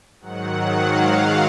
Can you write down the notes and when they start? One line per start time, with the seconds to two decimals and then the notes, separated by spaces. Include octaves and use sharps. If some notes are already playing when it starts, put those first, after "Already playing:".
0.20 G#2 D#3 F#3 F#5
0.79 F5